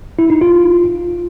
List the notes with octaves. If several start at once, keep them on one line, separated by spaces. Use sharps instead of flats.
E4
D#4
F4